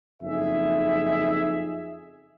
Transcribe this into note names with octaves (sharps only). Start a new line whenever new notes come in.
F#1 F2 D#4 G#4 E5